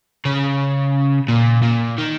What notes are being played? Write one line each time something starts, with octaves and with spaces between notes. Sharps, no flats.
C#3
A#2
A#2
D#3